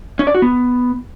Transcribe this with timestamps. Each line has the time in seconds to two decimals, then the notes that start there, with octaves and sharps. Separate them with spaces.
0.19 C#4
0.27 D5
0.35 F#4
0.42 B3